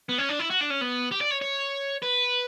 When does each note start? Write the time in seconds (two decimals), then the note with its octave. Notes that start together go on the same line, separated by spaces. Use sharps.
0.09 B3
0.18 C#4
0.29 D4
0.39 E4
0.50 F#4
0.61 D4
0.70 C#4
0.81 B3
1.11 G4
1.21 D5
1.31 C#5
1.42 C#5
2.02 B4